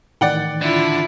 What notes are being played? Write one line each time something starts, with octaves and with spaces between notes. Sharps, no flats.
A2 D#3 E3 D5 F#5 G5
D3 E4 F4